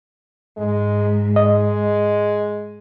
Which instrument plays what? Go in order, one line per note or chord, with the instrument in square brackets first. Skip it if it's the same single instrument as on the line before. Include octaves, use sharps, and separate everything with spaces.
[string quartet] G#2 [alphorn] G#3
[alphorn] G#3 [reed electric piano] D#5